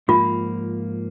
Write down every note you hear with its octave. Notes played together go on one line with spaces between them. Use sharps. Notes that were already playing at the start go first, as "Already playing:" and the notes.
G#2 F3 A#3 F4